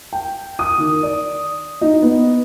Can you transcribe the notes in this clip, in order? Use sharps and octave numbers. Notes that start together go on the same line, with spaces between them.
G5
D#6
D#3
D5
D#4
B3